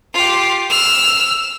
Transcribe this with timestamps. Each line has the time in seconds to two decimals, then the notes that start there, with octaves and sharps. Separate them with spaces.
0.14 F4 G4
0.70 E6 F6